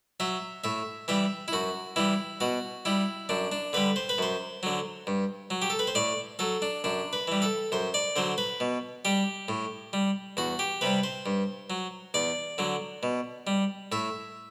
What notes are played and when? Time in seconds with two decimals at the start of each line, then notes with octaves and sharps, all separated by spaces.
0.20 F#3 E5
0.64 A2 E5
1.08 E3 G3 E5
1.48 E4
1.53 F#2 F#4
1.96 E3 G3 E4
2.41 B2 F#4
2.85 G3 E4
3.29 F#2 D4
3.52 D4
3.73 D3 G3 B4
3.96 C5
4.09 B4
4.18 F#2 C5
4.63 D3 F#3
5.07 G2
5.50 F#3
5.62 G4
5.70 A4
5.79 B4
5.87 C5
5.95 A2 D5
6.39 F#3 A4
6.62 D4
6.84 F#2 D4
7.13 B4
7.28 E3 G3
7.42 A4
7.72 F#2 C5
7.94 D5
8.16 D3 F#3 C5
8.38 B4
8.60 B2
9.05 G3 G4
9.48 A2
9.93 G3
10.37 E2 F#4
10.59 G4
10.81 C3 G3 B4
11.03 C5
11.26 G2
11.70 F#3
12.14 E2 D5
12.58 D3 F#3
13.03 B2
13.47 G3
13.92 A2 E5